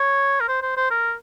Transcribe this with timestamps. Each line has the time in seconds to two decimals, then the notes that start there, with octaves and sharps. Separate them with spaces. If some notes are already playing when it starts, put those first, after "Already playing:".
Already playing: C#5
0.40 A#4
0.48 C5
0.62 C5
0.77 C5
0.91 A#4